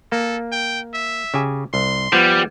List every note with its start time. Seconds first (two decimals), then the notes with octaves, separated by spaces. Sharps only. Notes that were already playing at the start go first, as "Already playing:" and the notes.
0.12 A#3 A4
0.52 G5
0.94 E5
1.34 C#3 G4 G#5
1.74 C2 C6
2.13 F3 G3 B3